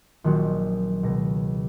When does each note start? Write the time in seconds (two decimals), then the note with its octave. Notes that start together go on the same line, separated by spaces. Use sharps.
0.24 A#1 D#3 F#3 C4 F#4
1.03 C#2 B2 A#6